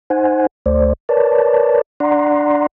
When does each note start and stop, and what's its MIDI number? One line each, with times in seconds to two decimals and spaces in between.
0.10 0.47 63
0.10 0.47 72
0.10 0.47 78
0.10 0.47 80
0.66 0.93 38
0.66 0.93 57
0.66 0.93 72
0.66 0.93 74
1.09 1.81 70
1.09 1.81 71
1.09 1.81 73
1.09 1.81 74
1.09 1.81 81
2.00 2.66 62
2.00 2.66 74
2.00 2.66 78
2.00 2.66 82
2.00 2.66 84